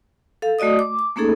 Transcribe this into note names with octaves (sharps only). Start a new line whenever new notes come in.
A4 F5
A3 F#4 D5 D#5 D#6
D6
D6
A3 A#3 C#4 D#4 G#4 A4